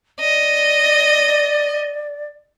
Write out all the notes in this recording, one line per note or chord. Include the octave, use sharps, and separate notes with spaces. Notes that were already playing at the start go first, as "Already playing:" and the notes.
D5 D#5